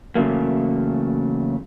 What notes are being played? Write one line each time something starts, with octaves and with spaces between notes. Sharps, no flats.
E2 C#3 F#3 A3 A#3